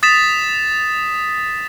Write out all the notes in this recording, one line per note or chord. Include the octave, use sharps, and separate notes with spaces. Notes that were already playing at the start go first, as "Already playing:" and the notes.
D#6 A6 B6 E7